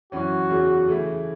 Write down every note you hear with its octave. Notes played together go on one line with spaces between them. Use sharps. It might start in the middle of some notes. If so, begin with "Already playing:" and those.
F#2 E3 C#4 F#4
E2 C#3 F#3
C#3 E3 A3 E4